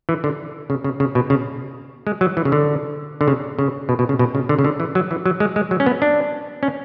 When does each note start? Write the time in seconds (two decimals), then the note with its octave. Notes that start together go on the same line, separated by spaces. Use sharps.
0.09 E3
0.24 D3
0.70 C#3
0.84 C#3
1.00 C#3
1.15 B2
1.30 C#3
2.07 G#3
2.21 F#3
2.37 E3
2.45 C#3
2.52 D3
3.21 D3
3.28 C#3
3.59 C#3
3.89 B2
3.99 B2
4.09 C#3
4.19 B2
4.35 C#3
4.49 D3
4.59 C#3
4.65 D3
4.80 E3
4.95 F#3
5.11 E3
5.26 F#3
5.40 G#3
5.56 G#3
5.71 F#3
5.80 C#4
5.86 B3
6.02 D4
6.63 C#4